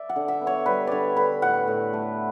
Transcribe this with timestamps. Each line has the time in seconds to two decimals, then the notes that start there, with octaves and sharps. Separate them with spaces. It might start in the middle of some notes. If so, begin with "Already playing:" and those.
Already playing: D5 E5
0.09 F#5
0.16 D3
0.28 E5
0.41 B3
0.47 C#5
0.66 G3 B4
0.87 D3 C#5 D5
1.17 D3 B4
1.42 A2 F#5
1.67 A2
1.93 A3